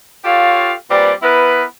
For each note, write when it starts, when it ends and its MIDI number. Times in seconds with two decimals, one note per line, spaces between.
0.25 0.73 65
0.25 0.73 67
0.25 0.73 69
0.25 0.73 73
0.25 0.73 77
0.90 1.12 46
0.90 1.12 55
0.90 1.12 60
0.90 1.12 71
0.90 1.12 74
1.22 1.65 59
1.22 1.65 64
1.22 1.65 70
1.22 1.65 71